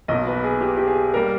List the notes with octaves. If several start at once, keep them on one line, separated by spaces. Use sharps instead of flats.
B1 B2 A#3 D#5
B4
G#4
G4
G4
G#4
G3 A#3 A#4